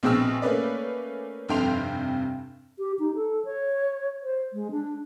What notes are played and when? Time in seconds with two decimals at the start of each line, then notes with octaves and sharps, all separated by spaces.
0.03 A#1 B2 C4 G#4 E6 F6
0.42 A3 A#3 C#4 B4 D5
1.49 F1 G2 C3 G5 C6 F7
2.79 G4
2.99 D#4
3.15 A4
3.45 C#5
4.23 C5
4.53 G#3
4.71 D4